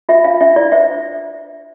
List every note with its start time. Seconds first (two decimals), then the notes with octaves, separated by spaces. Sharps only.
0.09 F4 E5
0.24 D4 F5
0.41 D4 E5
0.56 E4 D5
0.72 C5 E5